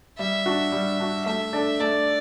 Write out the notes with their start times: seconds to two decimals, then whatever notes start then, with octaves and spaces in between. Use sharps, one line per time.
0.18 G3 E5
0.46 D4 F#4
0.72 G3
1.00 D4 F#4
1.26 A3 E5
1.53 D4 A4 D5
1.80 A3 D5